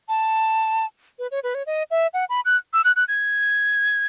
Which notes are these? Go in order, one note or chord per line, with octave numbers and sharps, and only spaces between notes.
A5
B4
C#5
B4
C#5
D#5
E5
F#5
B5
F#6
E6
F#6
F#6
G#6